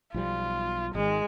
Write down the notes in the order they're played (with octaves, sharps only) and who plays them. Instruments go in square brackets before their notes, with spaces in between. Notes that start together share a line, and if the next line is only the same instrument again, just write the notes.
[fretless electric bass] B1 F3 G3 [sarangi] F4
[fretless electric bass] G#1 D#3 [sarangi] G#3